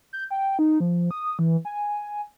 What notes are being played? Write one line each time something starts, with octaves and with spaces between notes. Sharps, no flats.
G6
G5
D#4
F3
D#6
E3
G#5